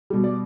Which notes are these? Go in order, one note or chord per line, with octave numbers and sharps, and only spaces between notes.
B2 G3
D5